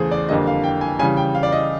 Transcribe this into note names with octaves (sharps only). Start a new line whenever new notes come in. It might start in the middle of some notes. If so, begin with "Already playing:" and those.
Already playing: E2 C#3 E3 A3 G#4 C5
D5
F2 D3 G3 A#3 D#5
F5
G5
G#5
C#3 E3 G3 G#5
G5
F5
D5
D#5